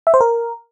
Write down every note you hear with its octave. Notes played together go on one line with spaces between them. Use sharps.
E5
C5
A#4